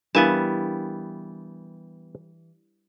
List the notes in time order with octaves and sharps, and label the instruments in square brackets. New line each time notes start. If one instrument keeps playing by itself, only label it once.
[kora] E3 G3 [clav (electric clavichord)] B3 G#5 A5 [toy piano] D4 A#4 F5